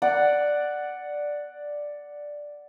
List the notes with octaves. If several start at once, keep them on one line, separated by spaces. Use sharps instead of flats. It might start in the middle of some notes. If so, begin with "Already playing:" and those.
D5 F#5